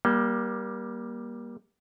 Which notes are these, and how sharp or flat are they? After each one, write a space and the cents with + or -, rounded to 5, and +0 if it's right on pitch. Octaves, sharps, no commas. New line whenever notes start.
G3 +0 A#3 +25